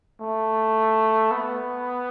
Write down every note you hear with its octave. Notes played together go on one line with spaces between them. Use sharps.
A3
B3